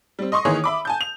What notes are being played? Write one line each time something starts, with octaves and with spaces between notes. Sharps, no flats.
G3 C4
D#5 C6 C#6 D#6
D#3 E3 A#3 D#4 G#4 C#5
E5 B5 D6
G#5 A5 G6
F7